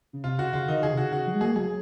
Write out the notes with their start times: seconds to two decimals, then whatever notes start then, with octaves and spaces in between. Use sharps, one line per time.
0.13 C#3
0.24 C3 F4
0.39 C#3 F#4
0.53 C#3 F4
0.68 D#3 D#4
0.83 C#3 G#4
0.93 C3
0.97 C#3 F#4
1.12 C#3 F#4
1.27 F#3
1.35 G#3
1.41 A#3 G#4
1.55 F#3 G#4